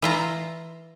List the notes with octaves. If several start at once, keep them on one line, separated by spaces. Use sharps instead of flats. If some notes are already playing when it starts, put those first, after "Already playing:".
E3 F4 A#5